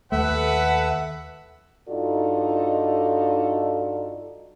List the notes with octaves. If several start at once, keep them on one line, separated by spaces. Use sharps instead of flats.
D#2 A3 A4 B4 E5 F#5
G2 D#4 F4 F#4 A4 D5